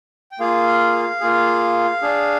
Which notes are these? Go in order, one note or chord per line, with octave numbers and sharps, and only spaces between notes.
G5
A#3 F4 G#4 F5
A#3 F4 G#4
D4 G#4